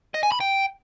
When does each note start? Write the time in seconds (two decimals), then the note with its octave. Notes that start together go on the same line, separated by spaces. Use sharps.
0.14 D#5
0.23 G#5
0.32 B5
0.40 G5